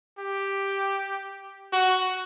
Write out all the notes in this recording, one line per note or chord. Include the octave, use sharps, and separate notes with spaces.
G4
F#4